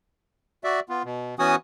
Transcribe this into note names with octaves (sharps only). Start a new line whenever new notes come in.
F#4 D5 E5
B3 F4
B2
E3 B3 C#4 F#4 G#5 D#6